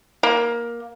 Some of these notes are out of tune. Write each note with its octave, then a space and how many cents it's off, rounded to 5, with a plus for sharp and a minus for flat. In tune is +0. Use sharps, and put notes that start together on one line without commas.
A#3 +15